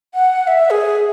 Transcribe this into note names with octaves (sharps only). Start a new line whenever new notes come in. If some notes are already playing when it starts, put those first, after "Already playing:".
F#5
F#5
E5
G#4